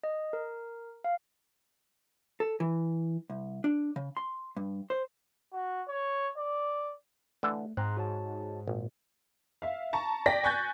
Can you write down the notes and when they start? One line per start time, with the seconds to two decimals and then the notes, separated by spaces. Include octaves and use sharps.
0.04 D#5
0.33 A#4
1.04 F5
2.40 A4
2.60 E3
3.30 C2
3.64 D4
3.96 C#3
4.17 C6
4.57 G2
4.90 C5
5.53 F#4
5.88 C#5
6.37 D5
7.43 D3 E3 A3 A4
7.77 G#2 C4 A#5 C6 F#6
7.97 F#4 C#5 A5
8.68 G#1 A#2
9.62 E5 F5
9.93 A5 A#5 C#6
10.26 D5 G5 A#6 B6
10.43 G#5 C#6 F#6 G6 A6